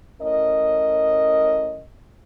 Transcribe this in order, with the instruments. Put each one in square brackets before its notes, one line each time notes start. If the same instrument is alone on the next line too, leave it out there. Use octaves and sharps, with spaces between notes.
[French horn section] A2 C#4 A#4 D#5